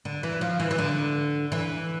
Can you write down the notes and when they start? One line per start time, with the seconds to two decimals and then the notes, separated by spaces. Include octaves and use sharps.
0.05 D3
0.23 E3
0.41 F3
0.60 E3
0.71 E3
0.78 D3
1.52 E3